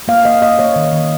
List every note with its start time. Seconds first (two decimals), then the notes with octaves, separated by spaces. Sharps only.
0.08 A#3 F5
0.25 A#3 D#5
0.42 A#3 D#5
0.59 A#3 C#5
0.76 D#3
0.93 D#3